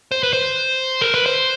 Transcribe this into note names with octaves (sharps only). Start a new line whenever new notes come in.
C5
B4
C5
A#4
B4
C5